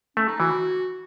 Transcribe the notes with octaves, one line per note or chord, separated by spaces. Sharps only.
A3 C#4
D#4
E3 F#4